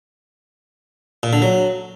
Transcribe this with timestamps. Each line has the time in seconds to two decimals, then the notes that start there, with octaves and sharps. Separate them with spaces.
1.23 A#2
1.33 D3
1.42 F#3